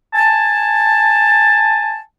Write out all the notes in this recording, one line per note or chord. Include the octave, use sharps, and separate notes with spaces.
G#5 A5